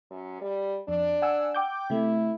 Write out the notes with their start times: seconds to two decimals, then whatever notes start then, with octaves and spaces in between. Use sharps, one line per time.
0.11 F#2
0.41 G3
0.88 F2 D4
1.22 F#5 G#5 E6
1.55 G5 D6 G6
1.90 C3 A3 E4